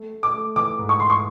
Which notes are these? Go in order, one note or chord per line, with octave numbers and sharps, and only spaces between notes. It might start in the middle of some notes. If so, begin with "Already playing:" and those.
Already playing: A3
A3
D6
A3
E3 D6
G#2
C#6
E3 C6
C#6